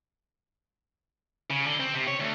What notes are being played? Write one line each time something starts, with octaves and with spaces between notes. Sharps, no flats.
C#3
D3
C4
C3
C#5
D2